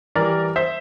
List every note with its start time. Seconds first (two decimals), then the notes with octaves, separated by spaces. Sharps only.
0.15 E3 G3 A#4 D5
0.56 C5 E5